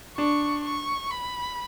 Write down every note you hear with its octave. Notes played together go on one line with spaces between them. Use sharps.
D4 C#6
C#6
B5